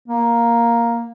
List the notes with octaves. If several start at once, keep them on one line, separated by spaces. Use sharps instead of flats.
A#3